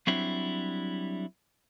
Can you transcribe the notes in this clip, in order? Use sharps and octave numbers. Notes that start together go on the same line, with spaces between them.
F#3 G3 C4 D4 E4